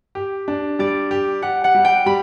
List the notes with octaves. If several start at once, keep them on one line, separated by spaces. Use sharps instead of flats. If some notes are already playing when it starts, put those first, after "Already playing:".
G4
D4
G3 D5
G4
G4 F#5
F#5
G3
G5
G3 B5